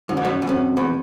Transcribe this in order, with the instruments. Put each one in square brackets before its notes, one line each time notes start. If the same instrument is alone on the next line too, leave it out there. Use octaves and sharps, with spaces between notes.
[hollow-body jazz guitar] F#2 [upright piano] D#3
[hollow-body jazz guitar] G#2
F#2
E2
[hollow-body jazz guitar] F#2 [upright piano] C4
[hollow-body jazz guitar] E2